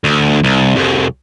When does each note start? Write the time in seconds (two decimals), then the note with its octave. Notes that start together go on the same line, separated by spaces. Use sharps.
0.04 D2
0.43 C2
0.76 C2 F2